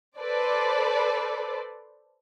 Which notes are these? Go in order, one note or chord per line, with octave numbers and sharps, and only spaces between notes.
A4 B4 C5 D5